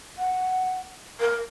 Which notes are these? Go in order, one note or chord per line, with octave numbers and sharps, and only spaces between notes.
F#5
A#4